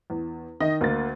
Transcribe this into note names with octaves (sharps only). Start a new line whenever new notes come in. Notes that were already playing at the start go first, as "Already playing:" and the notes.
E2
D#3 D#5
D2 A#3 A6